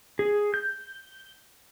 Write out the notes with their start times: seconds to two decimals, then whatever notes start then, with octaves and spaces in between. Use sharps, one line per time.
0.19 G#4
0.54 G6